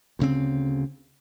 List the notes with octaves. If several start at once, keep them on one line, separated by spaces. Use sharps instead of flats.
D2 C#3 C4